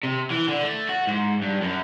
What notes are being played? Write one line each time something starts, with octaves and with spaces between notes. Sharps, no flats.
C3
E3
D3
A3
F#4
G#2
G2
F#2